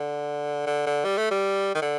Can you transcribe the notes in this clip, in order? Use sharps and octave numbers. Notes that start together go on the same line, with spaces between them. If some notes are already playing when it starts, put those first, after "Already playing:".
Already playing: D3
D3
D3
G3
A3
G3
D#3
D3